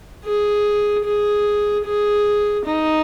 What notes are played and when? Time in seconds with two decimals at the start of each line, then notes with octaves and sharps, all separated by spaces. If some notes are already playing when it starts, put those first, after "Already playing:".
0.25 G#4
1.05 G#4
1.85 G#4
2.65 D#4